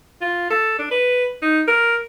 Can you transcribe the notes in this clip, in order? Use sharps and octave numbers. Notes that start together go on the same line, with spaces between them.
F4
A4
D4
B4
D#4
A#4